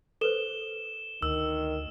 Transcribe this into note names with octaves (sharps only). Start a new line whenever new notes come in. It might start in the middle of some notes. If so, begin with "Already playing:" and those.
A4 B4 C5 E7 G7
D2 D#3 E6